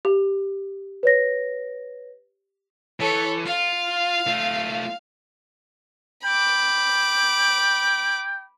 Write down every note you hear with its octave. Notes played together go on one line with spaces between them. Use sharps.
G4
B4 C#5 A#6
E3 A4 C#5
F4 F5
A3 F4
G5 B5 D6